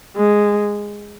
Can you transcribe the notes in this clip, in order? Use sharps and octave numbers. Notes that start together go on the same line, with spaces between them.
G#3